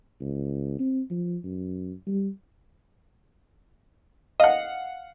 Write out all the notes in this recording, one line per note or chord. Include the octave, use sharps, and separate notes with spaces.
C#2
C4
F3
F#2
G3
D#5 F5 F#5